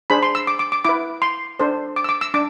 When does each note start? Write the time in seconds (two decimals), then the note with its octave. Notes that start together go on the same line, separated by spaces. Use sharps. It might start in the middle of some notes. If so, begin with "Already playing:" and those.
0.10 D4 G#4 C5 B5
0.23 C6
0.35 E6
0.47 D6
0.59 D6
0.72 D6
0.84 E4 B4 D6
1.22 C6
1.60 D4 A4 C5
1.96 D6
2.04 E6
2.09 D6
2.21 E6
2.34 D4 D6